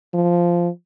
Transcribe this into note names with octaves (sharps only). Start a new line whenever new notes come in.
F3